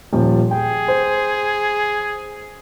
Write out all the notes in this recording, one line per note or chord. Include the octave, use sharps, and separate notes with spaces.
D#1 F3
G#4 G5
C5